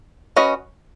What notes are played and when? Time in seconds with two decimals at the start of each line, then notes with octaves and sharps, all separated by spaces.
0.36 C#4 F#4 B4 D#5